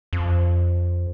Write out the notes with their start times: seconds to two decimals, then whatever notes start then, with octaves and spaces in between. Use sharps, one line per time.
0.13 F2